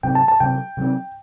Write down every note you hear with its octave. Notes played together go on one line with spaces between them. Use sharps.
C3 F#3 C4 G5
A5
A5
C3 F#3 C4 G5
C3 F#3 C4